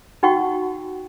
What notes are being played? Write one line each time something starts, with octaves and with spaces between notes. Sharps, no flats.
D#4 F#4 F#5 G5 C#6